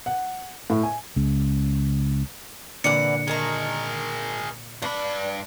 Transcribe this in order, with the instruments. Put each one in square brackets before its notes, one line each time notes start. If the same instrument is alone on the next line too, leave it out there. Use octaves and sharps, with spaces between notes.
[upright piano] F#5
A2
G#5
[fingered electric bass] C#2 C#3
[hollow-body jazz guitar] A#2 D3 [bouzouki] E3 D5 F#5 [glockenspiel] C#7
[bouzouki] D#3 A5 A#5 [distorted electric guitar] G#4 A#4
[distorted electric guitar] G2 B5 [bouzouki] D4